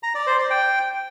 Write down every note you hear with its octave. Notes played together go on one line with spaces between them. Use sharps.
A#5
D5
C5
D5
G5